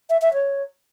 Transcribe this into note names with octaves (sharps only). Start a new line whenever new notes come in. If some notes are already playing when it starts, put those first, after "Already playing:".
E5
E5
C#5